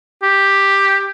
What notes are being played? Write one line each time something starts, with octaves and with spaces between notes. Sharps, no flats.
G4